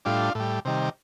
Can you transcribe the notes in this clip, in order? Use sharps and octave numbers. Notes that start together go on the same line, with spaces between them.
A2 G3 D4 F4
A2 G3
C3 D#3 G3